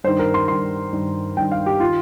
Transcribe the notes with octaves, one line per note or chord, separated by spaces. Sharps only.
G2 D#3 C5
A#4
C6
G2 D#3 C6
G2 D#3
G2 D#3 G5
F5
G4
D#3 F4